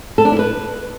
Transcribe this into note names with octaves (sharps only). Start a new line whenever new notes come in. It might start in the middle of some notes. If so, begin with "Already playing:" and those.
A4
D4
E4
B4